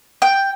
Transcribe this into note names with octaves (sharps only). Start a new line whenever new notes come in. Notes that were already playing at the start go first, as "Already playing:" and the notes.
G5